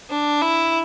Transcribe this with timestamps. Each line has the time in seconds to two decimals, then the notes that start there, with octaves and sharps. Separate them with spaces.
0.10 D4
0.42 E4